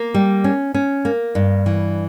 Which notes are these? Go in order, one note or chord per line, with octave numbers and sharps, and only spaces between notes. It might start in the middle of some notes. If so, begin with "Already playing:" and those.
Already playing: A#3
G3
C#4
C#4
A#3
G2
E3